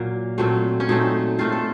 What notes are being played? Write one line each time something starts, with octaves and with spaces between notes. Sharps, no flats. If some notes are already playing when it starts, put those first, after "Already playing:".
Already playing: A#2 F#3 A#3 A#4
A#2 F#3 A3 C4
C#4
A#2 F#3 A3 C4 D#4
A#2 A3 C4 F4
A4